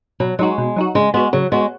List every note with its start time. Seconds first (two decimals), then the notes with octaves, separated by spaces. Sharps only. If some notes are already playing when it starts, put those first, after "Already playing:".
0.20 B2 F#3
0.39 F#3 G#3 D#4 F#4
0.58 B2
0.76 F#3 D#4 F#4
0.95 C#3 G#3
1.14 G#3 B3 F#4
1.33 C#3 F#3
1.52 G#3 B3 F#4